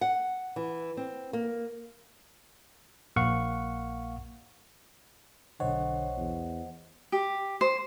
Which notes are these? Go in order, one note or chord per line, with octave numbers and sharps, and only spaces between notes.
F#5
E3
C4
A#3
A#1 A#3 F5 F#5 C#6
B1 D3 C5 C#5 D#5 F#5
E2
G4
C5